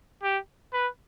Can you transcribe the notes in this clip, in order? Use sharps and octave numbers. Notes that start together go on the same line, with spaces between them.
G4
B4